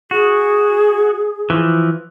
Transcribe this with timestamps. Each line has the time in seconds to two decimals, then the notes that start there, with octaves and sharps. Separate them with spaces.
0.11 F#4 G#4
1.50 E3 F3